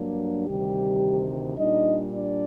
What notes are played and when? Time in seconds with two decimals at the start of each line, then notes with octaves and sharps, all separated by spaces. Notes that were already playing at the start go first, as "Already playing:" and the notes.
Already playing: G2 F#3 A#3 D4
0.48 D2 C3 D#3 G3 G4
1.59 A#2 G3 D4 D#4 D#5
2.14 D4 D5